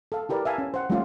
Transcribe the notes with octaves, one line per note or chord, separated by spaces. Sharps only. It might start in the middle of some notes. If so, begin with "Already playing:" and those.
A4 F5
E4 G4 A#4 B4 D5
E5 F5 G#5 A5
C#4
C5 F#5
G3 A3 A#3 C#4 F4 G4